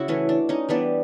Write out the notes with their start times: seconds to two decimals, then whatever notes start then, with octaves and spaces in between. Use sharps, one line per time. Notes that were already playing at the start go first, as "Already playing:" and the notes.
Already playing: C#3 E4 F#4
0.08 E3 A3 C#4
0.29 D4
0.49 C#4 D#4
0.69 E3 G3 B3 D4